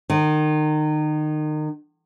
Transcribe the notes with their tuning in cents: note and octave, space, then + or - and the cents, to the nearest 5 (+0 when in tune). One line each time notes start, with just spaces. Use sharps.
D#3 -30